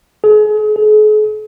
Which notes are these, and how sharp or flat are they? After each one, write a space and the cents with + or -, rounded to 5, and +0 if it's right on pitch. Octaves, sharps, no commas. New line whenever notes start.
G#4 +35
G#4 +45